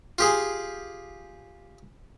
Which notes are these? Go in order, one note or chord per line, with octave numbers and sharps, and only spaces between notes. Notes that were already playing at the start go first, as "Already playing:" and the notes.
F4 G4 G#4